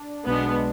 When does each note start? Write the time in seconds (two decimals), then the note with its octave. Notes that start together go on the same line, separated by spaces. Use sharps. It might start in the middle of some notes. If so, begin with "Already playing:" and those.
Already playing: D4
0.25 B1 B2 G#3 B3 D4